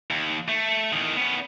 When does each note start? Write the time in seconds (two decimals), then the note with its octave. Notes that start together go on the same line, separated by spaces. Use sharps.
0.11 D#2
0.49 A3
0.93 E2 D#3
1.17 B3 C#4